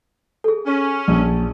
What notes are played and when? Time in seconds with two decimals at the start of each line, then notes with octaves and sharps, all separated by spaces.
0.44 G#4 A4
0.66 C#4
1.08 A#1